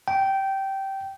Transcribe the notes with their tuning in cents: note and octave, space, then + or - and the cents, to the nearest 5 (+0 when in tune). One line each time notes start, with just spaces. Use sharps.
G5 -15